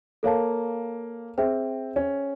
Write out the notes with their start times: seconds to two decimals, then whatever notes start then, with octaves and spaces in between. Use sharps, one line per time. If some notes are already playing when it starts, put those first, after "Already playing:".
0.23 A#3 A4 C#5 F5 A5
1.38 C4 G#4 C5 E5 G5
1.96 C#4